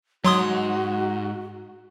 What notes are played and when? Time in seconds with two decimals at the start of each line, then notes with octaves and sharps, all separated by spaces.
0.25 G#2 F#3 F#4 C6 D#6